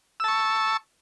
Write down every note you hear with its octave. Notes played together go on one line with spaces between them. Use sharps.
A5 C#6 E6